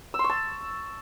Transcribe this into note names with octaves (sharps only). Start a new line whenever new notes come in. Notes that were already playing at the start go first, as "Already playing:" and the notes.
E6
C6
C#6
A5